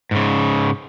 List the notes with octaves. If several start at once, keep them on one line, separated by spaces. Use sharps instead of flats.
G#2 C#3